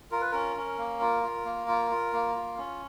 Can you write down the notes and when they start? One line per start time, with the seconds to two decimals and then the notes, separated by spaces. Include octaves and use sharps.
0.11 F4 A#4
0.21 B4
0.31 C#4 A#4
0.56 C#4
0.78 A#3
1.01 F4
1.23 F4
1.45 A#3
1.68 F4
1.91 F4
2.13 A#3
2.35 F4
2.58 C#4